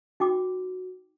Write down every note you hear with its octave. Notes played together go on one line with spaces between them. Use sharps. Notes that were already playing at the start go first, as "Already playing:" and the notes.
D#4 F#4 G5 D6